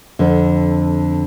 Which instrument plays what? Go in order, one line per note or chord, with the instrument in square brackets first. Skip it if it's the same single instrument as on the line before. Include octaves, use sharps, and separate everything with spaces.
[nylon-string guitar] F2 D3